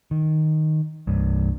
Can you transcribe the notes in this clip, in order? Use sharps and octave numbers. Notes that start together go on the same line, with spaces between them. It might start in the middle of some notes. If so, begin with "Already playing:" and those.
D#3
C2 G2